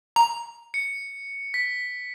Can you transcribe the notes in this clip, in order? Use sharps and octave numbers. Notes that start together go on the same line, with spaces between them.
A#5
C#7
B6